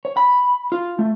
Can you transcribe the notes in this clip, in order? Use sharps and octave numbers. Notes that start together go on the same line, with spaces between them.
C#5
B5
F4
A3